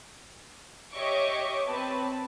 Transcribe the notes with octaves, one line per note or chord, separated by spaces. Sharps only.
G4 C#5 D#5 E5 C#6 D6
C4 B4 A5